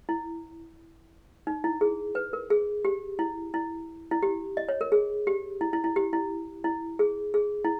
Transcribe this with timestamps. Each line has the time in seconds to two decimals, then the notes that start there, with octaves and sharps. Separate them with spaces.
0.09 E4
1.47 D#4
1.64 E4
1.81 G#4
2.15 B4
2.33 A#4
2.50 G#4
2.85 G4
3.19 E4
3.54 E4
4.11 E4
4.22 G4
4.57 D#5
4.69 C#5
4.81 A#4
4.92 G#4
5.27 G4
5.61 E4
5.73 E4
5.84 E4
5.96 G4
6.13 E4
6.64 E4
6.99 G#4
7.34 G#4
7.65 E4